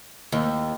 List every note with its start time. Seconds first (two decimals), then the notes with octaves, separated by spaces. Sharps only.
0.32 D#2